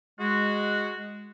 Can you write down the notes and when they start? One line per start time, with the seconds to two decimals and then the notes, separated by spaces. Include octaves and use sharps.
0.19 G#3 F#4